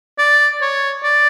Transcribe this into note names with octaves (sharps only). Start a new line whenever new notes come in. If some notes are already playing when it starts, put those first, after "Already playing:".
D5
C#5
D5